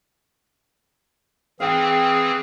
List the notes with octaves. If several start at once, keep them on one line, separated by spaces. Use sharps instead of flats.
E3 C4 G#4 F5 G5 G#5